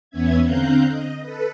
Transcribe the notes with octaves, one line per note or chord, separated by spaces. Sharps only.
E2 B3 C#4 E5 G#6
D3 C4 F5 A#5 F#6 G6
D#5
A4 B4